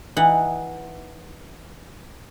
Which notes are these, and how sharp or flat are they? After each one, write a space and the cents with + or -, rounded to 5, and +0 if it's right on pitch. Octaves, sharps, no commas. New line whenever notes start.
E3 -10 D#4 +0 F#5 +0